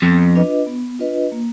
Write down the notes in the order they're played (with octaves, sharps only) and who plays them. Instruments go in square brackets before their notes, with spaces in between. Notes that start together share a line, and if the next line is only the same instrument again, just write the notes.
[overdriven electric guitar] F2 [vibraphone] B3
[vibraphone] D4 F4 B4 D#5
B3
D4 F4 B4 D#5
A#3